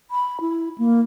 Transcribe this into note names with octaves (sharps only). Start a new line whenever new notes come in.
B5
E4
A#3